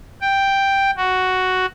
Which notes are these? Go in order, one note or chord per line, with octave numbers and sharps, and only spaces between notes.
G5
F#4